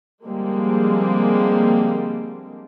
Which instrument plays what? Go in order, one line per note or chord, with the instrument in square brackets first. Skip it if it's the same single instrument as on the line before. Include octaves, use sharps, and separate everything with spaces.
[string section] D3 F3 G3 G#3 A#3 C4